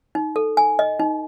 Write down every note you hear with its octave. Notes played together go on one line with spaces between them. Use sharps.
D#4
A4
G#5
D#5
D#4